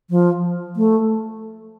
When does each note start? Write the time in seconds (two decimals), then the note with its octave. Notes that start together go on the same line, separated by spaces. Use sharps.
0.10 F3
0.76 A3